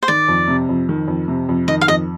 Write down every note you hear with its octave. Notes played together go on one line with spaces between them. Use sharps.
C5
D#3 D5
F2
C3
F2
D#3
F2
C3
F2
D#3 D#5
F5
F2 D#5